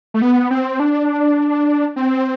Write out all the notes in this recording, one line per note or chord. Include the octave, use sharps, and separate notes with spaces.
A3
B3
C4
D4
C4